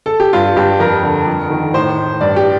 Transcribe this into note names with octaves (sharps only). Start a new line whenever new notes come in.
A4
G4
G2 F4
G2 G4
F2 A#4
D3
F2
D#3
A2 C5
A2
G2 D5
G4